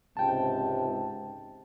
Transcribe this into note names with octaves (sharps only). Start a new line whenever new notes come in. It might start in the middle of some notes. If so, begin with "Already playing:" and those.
C#2 G#2 C3 G5 A5